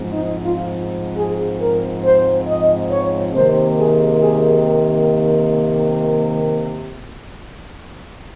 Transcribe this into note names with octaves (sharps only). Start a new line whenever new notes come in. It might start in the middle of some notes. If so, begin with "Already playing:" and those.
Already playing: G#2 F3 C4
D#4
F4
G#4
A#4
C5
D#5
C#5
C3 D#3 A#3 C5
G#4
G#4